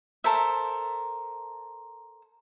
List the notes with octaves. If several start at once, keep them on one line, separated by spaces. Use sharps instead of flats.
A4 A#4 C5 E5